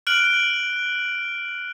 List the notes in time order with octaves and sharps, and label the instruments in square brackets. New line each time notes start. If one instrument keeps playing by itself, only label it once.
[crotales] F6 F#6 D7 F#7